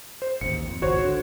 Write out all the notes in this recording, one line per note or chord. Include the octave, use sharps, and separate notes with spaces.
C5
A1 D#2 C#7
F2
G#1 C#2 F#4 C5 C#5
D3